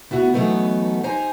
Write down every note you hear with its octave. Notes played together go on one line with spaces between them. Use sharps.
D2 B3 E4 F#4 F#5
E3 F#3 A3 B3 D#4
D#4 G4 C5 G#5 A#5